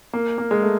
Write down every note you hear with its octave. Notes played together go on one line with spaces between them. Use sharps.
A#3
A#3
G#3
A3